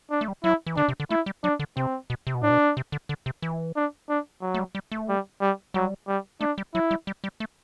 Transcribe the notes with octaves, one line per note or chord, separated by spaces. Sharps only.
D4
A3
G3
F#3 E4
E3
D3 D4
C3
D3
A3 E4
G3
F#3 D4
D3
C3 C4
B2
C3
B2
A2 D4
B2
C3
D3
D3
C3
E3
D4
D4
F#3
A3
G3
G3
A3
G3
G3
F#3 G3
G3
A3 D4
G3
F#3 E4
G3
G3
G3
A3